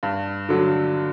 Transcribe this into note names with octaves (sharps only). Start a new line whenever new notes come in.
G2
D3 F#3